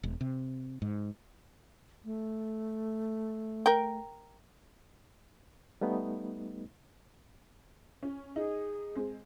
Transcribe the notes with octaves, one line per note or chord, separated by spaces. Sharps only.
E1
C3
G#2
A3
A#4 G5
G3 A3 B3 D#4
C#4
D#4 G#4
G#3 C4